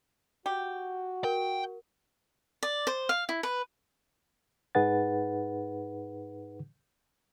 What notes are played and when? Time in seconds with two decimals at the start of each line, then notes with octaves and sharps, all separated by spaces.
0.46 F#4 G4
1.24 A#4 G5
2.63 D5
2.87 C5
3.09 F5
3.29 E4
3.43 B4
4.75 G#2 D#4 G#4 B4 F#5 A6